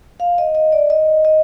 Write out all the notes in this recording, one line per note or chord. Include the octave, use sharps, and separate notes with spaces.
F5
D#5
D#5
D5
D#5
D#5